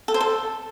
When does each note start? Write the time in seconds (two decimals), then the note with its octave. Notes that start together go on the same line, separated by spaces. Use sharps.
0.08 A4
0.14 C5
0.21 A4